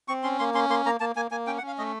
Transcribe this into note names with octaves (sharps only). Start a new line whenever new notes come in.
C4 C#6
C#4 C6
A#3 C6
C#4 C6
A#3 C6
A#3 A#5
A#3 A5
A#3 G#5
A#3 G#5
C#4 G5
F#5
C#4
F5
A3 D#5